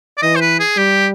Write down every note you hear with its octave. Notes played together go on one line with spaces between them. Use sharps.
D5
E3 D#5
C5
B4
G#4
G3 G4